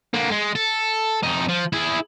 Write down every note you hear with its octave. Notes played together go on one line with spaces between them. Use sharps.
D3 A#3
G#3
A4
F2 D#4
F3
E4 G#4